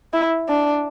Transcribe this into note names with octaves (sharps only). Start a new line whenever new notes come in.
E4
D4